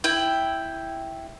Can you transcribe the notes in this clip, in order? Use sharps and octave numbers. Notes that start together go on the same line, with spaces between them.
E4 G5